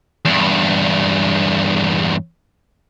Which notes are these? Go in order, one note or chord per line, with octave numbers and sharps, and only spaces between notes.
E2 G2